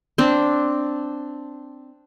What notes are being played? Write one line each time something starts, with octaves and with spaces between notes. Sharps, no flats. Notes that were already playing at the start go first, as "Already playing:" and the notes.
C4 D4